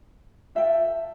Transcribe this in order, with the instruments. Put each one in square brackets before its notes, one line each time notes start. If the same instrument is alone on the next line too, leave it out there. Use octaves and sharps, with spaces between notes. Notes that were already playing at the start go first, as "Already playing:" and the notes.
[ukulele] F4 A4 E5 G5